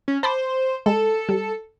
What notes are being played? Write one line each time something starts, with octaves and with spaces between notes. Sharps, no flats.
C#4
C5 A5 B5 D6
G#3 A4
G3